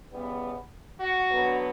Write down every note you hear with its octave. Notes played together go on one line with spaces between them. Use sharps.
C#3 E3 G3 B3
F#4
D3 F#3 B3